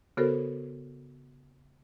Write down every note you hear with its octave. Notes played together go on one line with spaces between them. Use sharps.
C#3 B3 F#4 A4 A#4 C5